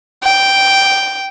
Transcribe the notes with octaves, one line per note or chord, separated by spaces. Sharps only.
G5